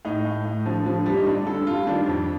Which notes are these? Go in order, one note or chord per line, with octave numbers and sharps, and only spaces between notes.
A2 D#4
A2
A2
D3 F3
D3 F3
D3 G3
D#4
G2 D4
D3 A4
G2 F4
D#3 D4
F2